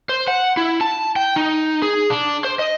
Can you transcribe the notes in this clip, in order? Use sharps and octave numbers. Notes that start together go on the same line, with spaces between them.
C5
F#5
E4
A5
G5
D#4
G#4
D4
C5
D#5